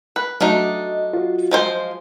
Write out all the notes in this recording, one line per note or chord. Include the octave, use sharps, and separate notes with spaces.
B4
F#3 A3 D4 D#4 F#4 D#5
F4 F#4
F3 G#3 C5